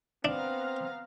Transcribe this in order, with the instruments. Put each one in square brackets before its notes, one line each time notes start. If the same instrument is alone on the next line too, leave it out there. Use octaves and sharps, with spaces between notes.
[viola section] B3 F5 A#5 [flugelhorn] C4 [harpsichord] D4